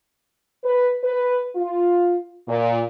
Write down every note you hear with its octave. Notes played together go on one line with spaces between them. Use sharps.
B4
B4
F4
A#2